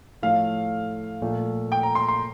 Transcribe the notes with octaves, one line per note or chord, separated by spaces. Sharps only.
A2 F3 A3 F5
A#2 F3 A3
G5
A#5
C6
C6